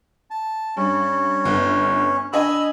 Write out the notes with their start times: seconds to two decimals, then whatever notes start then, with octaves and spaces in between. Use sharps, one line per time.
0.30 A5
0.77 G2 C#4
1.44 G1 B3
2.33 D4 D#5 G#5 B5 E6